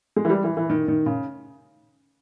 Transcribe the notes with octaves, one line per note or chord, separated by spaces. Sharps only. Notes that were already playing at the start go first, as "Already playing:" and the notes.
G#3
E3
G3
E3
E3
D#3
D#3
C#3